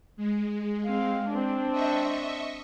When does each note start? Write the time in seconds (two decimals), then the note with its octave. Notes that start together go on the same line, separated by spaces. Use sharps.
0.17 G#3
0.85 C4 F5
1.29 C4 D4
1.72 D#5 E5 C#6